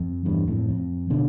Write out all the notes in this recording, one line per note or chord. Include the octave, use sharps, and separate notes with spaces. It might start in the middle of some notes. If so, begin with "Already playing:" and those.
Already playing: F2
E2 G2
F2 A2
F2
B2 D3